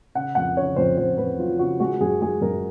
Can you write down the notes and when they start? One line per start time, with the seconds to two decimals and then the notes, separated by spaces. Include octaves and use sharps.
0.15 C#3 F#5
0.35 F2 F#5
0.57 C#3 C#5
0.76 F2 C5
0.98 F2 C5
1.18 F2 B4
1.39 F#3 F4
1.59 C#3 F#4
1.80 G#3 F#4
2.01 F#2 G#4
2.22 G#3 G#4
2.41 F#2 A#4